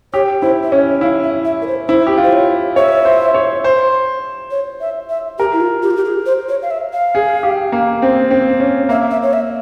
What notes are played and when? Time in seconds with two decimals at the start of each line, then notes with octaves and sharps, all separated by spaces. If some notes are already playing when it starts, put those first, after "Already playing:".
0.13 G4 C#5
0.42 E4 C5
0.63 E5
0.72 C#4 C#5
1.01 E4 F5
1.23 E5
1.45 E5
1.62 A#4
1.67 C5
1.88 E4 C5
2.07 G4
2.17 F4
2.24 C5
2.32 C#5
2.76 C#5 E5
3.05 C5
3.34 C#5
3.64 C5
4.51 C#5
4.81 E5
5.09 E5
5.39 G4 A#4
5.53 E4
5.60 F4
5.82 G4
5.90 F4
5.96 G4
6.05 G#4
6.26 C5
6.49 C#5
6.62 F5
6.71 E5
6.93 F5
7.15 G#4
7.43 G4
7.72 A#3
8.02 C4
8.31 C4
8.60 C#4
8.89 A#3 E5
9.11 E5
9.23 C#5
9.33 E5